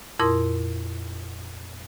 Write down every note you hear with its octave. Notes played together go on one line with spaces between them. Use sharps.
F2 A#2 E4 A#4 C6 D#6